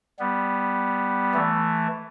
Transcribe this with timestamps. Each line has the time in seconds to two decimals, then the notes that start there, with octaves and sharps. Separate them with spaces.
0.19 G3 B3
1.34 E3 A3